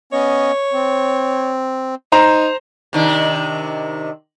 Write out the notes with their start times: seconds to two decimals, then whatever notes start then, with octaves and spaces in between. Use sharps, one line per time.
0.13 B3 C#4 C#5 D#5
0.73 C4
2.12 D#4 C5 A#5
2.93 C3 D#3 D4